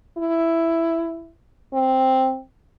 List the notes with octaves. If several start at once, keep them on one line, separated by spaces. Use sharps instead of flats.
E4
C4